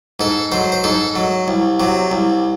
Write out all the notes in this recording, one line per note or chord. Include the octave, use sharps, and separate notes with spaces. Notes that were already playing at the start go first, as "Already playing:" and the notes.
G#2 A4
F#3 C5
C5
G#2 A4
F#3
C2
C3 F#3
C2